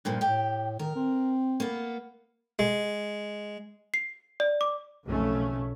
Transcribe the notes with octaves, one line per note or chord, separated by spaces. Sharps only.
G2 A#2 F3
A2 G4 G5
D#3 A#4
C4
A#3 B3
G#3
C7
D5
D6
B1 F2 C#3 A3 C#4